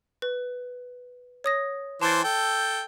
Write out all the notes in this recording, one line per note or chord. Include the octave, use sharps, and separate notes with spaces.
B4
C#5 D#6 A#6
E3 C5 A5 A6
A4 G5